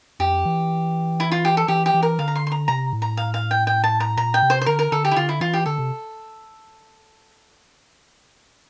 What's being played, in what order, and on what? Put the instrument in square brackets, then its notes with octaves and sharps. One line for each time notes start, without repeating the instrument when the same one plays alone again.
[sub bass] F2 [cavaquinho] G4
[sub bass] E3
[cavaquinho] E4
F4
G4
A4
[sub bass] E3 [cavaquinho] G4
[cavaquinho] G4
[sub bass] E3
[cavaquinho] A#4
[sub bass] D3 [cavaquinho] F5
[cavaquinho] A#5
C6
C6
A#5
[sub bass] C3 [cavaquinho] A#5
[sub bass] A2
[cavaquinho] A#5
F5
F5
G5
G5
A5
A#5
[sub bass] A#2 [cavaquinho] A#5
[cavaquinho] G5
[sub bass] C3
[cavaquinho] C5
C5
[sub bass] D3 [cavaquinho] A#4
[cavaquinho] A#4
[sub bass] D3 [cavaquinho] A4
[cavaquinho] G4
E4
[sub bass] D3 [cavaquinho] F4
[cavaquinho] E4
[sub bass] E3 [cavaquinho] F4
[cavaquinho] G4
[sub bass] D3 [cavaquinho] A4
[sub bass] C3